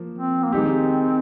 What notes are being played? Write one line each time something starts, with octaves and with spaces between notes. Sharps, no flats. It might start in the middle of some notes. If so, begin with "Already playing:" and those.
Already playing: F3 A#3
C4
A#3
D#3 G#3 C4 D#4 G4